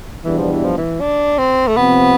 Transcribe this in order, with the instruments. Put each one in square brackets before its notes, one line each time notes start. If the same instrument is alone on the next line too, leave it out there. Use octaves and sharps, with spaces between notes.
[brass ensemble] E2 B2 G3 B3 D4 [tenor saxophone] E3
[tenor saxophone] F3
E3
F3
E3
D4
C4
A3
[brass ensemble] C3 F3 C4 [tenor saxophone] B3